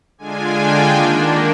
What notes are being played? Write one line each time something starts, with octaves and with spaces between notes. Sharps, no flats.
D3 G#3 D4 F4 G#5
G5
D#3 A#3 D4